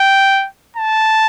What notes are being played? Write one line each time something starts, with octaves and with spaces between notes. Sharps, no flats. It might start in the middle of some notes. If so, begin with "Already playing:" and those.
Already playing: G5
A5